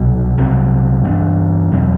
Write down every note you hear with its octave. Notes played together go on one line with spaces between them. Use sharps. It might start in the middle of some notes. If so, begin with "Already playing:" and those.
Already playing: C2 B2 F#3
C2 C3 F#3 C4
G2 E3 B3 D4
E2 B2 F#3 C4